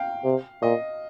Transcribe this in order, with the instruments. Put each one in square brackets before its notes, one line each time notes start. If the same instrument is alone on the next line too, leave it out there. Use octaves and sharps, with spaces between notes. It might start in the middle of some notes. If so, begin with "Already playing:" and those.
Already playing: [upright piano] F5 G5
[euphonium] C3
[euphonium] A#2 [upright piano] D#5